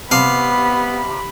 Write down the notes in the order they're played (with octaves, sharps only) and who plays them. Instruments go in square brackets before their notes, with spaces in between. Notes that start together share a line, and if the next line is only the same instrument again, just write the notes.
[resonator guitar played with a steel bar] C3 [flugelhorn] B3 [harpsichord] F5 [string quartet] B5